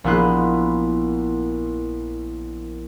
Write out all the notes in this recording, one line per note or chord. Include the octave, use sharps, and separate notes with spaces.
A#1 A#3 B3 E4 C6 F#6